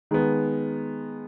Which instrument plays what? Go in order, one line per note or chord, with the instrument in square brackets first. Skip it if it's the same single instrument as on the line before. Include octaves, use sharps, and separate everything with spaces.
[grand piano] D#3 G#3 B3